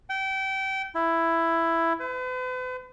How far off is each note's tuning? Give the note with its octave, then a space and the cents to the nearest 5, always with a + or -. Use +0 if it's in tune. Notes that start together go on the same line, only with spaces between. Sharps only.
G5 -25
E4 +10
B4 +45